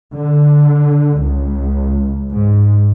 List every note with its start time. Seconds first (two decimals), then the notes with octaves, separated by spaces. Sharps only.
0.15 D3
1.21 C#2
2.32 G#2